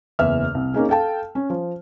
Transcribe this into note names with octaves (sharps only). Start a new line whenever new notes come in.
F#1 E2 E5 F6
C2
A#3 C#4 D#4 G#4
A4 F5 G5 A5
C#4
F3